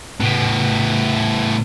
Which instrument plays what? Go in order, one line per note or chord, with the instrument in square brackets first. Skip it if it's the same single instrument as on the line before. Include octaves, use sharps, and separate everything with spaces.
[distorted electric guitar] A2 B3